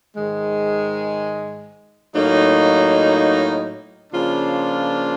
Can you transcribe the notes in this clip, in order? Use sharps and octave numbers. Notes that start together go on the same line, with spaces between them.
G#2 D#3 G#3
A2 F#3 A#3 D#4
C#3 F3 A#3 D4 F4